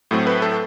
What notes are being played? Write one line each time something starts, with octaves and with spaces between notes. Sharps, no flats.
A2 F#3 A3 C4
B4
A4